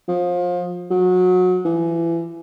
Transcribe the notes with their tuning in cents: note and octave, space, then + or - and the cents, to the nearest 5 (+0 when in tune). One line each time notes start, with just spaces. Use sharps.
F3 +25
F#3 -25
E3 +25